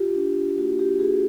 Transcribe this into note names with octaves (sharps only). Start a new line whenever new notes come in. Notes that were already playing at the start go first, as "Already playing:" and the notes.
Already playing: F4 G4
D4
A#3 F#4
G4
A#3 F#4 G#4